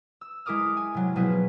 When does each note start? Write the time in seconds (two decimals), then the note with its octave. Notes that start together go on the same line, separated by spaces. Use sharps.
0.21 E6
0.46 G#3 E4 A#4 D6 D#6 F6
0.77 G#5
0.94 C3 F#3
1.16 B2 F3 F#3 B3 E4 G#4